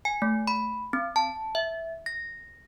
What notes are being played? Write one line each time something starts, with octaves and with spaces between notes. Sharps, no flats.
G#5
A3
B5
C4
A5
E5
A#6